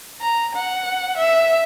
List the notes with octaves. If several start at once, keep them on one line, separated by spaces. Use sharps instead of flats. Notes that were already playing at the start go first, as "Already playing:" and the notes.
A#5
F#5
E5